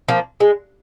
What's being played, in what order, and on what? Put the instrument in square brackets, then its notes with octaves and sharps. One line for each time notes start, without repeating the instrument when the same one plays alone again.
[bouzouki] F3 A#3
G#3